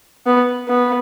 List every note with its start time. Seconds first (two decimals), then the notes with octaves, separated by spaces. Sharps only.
0.26 B3
0.68 B3